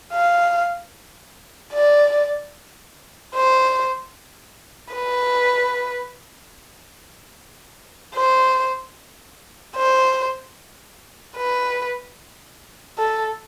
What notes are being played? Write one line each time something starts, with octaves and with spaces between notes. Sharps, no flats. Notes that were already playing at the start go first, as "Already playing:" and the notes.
F5
D5
C5
B4
C5
C5
B4
A4